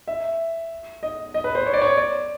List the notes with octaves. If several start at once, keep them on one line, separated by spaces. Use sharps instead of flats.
E5
D#5
D#5
B4
C5
C#5
D5
C#5
D5